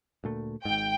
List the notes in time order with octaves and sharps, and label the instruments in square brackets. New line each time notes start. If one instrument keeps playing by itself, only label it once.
[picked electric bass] D2 A#2 A3
[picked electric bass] G#1 G#2 [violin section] G5